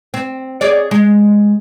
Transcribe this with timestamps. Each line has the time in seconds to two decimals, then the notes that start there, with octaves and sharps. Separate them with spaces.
0.14 C4
0.61 G#4 C#5 D5
0.91 G#3